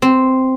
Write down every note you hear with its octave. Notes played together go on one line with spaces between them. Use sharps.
C4